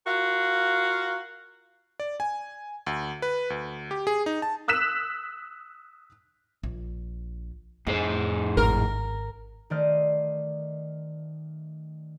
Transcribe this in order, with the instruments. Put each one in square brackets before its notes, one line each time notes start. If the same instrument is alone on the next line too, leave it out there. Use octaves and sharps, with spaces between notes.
[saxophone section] F4 F#4 A#4 F5
[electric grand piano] D5
G#5
D2
B4
D2
G4
G#4
D#4
A5
[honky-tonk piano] D#6 E6 F#6 B6 E7
[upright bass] A#1
[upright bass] F2 [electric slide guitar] A2 G#4 C5
[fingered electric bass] G#1 [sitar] A#4
[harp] D#3 A3 C5 D5 D#5 F6